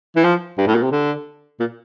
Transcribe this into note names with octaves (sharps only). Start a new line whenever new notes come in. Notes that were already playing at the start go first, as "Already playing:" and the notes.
E3
F3
G2
A2
A#2
C3
D3
A#2